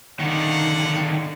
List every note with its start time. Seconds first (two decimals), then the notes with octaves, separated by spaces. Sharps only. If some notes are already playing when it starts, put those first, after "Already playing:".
0.20 D3 D#3 F5 F#5